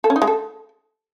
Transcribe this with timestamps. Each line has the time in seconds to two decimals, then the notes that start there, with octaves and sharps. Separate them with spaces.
0.04 A4
0.10 C#4
0.16 D#4
0.22 G#3
0.27 A4